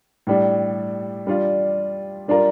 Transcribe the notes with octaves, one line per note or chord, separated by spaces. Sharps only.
A2 G3 D4
G3 D4 F4
G3 D4 F4 A#4